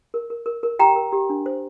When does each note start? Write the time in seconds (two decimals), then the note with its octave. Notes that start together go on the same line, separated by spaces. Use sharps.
0.14 A#4
0.30 A#4
0.46 A#4
0.63 A#4
0.79 G4 G5 A#5
0.96 A#4
1.12 G4
1.30 D4
1.46 C5